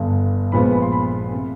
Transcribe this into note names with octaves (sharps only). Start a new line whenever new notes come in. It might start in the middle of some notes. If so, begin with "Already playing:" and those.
Already playing: G1 G2 D3
A#1 A#2 F3 G#3 B3 B5
B5
C6
B5
C3